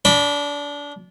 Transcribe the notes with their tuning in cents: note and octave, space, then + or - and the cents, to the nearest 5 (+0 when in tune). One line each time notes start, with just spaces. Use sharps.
D4 -25 D5 +35 B5 -10